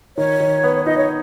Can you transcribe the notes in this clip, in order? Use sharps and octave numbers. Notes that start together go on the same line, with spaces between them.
D#3 C#5
D#3
B3
D#4 D#5
C#5